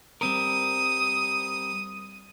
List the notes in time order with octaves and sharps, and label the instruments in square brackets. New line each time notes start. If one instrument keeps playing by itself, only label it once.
[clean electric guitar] G3 C4 A#4 [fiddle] D#6